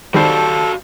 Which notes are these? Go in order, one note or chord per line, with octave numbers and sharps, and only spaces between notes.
D#3 G3 F#4 A4 C5 F5 A5